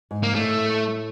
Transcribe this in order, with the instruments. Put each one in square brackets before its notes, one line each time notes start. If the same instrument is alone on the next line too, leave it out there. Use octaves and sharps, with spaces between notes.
[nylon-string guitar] G#2
[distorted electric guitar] A#3
[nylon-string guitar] A2 [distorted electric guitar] A3